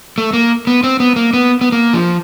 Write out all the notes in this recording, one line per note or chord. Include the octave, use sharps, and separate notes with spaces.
A3
A#3
B3
C4
B3
A#3
B3
B3
A#3
F3